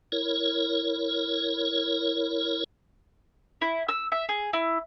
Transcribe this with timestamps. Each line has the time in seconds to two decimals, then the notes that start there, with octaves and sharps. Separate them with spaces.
0.12 E4 A#4 C#5
3.61 E4
3.88 E6
4.12 E5
4.29 G#4
4.53 E4